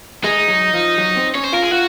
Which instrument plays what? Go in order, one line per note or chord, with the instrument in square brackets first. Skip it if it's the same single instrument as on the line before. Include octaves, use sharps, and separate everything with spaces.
[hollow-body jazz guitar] G#3 [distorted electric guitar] D#4
[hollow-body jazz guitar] F#3
F3
F#3
C4
[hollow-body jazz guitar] C#4 [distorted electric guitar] C#5
[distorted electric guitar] C5
[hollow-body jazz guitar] F4 [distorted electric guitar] A#4
[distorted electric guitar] G#4
[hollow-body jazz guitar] F4 [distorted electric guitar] F#4